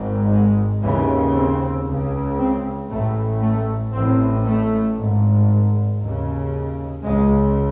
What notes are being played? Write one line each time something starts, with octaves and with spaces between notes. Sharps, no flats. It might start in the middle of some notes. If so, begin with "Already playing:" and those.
Already playing: G#1 G#2
G#3
D#2 C#3 E3
C4
C#2 C#3
C4
A1 A2 A3
A3
A1 A2 C4
A3
G#1 G#2
D#2 C#3
C#2 C#3 G#3